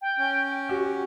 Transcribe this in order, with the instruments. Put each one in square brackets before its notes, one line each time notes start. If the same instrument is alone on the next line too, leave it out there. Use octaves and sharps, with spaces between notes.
[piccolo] G5
[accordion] C#4
[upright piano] F#4 G4